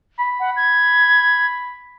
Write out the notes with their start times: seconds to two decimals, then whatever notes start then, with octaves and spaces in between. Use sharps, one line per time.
0.19 B5
0.40 F#5
0.56 G#6